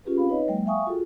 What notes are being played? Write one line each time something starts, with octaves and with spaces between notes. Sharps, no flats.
C#4 F4 G4 G#4 B4
C4 F5 B5
D#4 B4 C#5 D#5
F#3 G#3 A#3 G5
E5 F5 G5 G#5 C#6 D#6
F4 F#4 G#4 A4